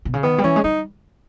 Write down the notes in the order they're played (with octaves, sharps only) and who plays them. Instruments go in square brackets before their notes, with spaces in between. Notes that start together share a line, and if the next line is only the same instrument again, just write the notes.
[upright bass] B2
C#3
[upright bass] D#3 [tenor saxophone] B3
[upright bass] G3
[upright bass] E3 [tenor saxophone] C#4
[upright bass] G#3
[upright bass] G3 [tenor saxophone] D#4